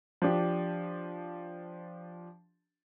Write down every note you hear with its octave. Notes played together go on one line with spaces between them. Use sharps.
F3 D4 G4